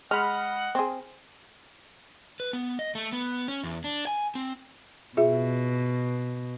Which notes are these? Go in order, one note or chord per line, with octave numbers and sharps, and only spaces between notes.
G#3 D#5 F#5 B5 F6
C4 G#4
B4
B3
D#5
A3
B3
C#4
E2
D4
G#5
C4
B2 F4 G#4 E5